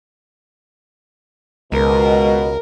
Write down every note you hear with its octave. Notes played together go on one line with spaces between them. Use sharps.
C#2 B2 G#3 A#4